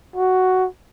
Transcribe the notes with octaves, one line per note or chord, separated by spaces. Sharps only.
F#4